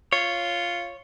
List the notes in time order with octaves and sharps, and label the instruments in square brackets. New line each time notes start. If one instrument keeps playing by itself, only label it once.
[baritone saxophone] F4 [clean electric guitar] C#5